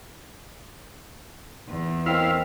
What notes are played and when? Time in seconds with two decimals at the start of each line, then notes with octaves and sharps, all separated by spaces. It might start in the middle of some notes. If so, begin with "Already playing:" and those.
1.69 E2
2.06 A#3 C4 E4 D#5 F5